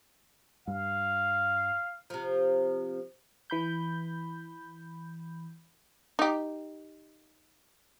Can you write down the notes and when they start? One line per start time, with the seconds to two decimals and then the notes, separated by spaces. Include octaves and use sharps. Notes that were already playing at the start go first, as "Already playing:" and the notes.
0.68 G2 F5
2.10 C3 F3
3.50 E3 B5 G6
6.19 D#4 G4